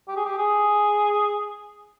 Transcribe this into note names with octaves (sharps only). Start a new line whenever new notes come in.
G4
G#4
G4
G#4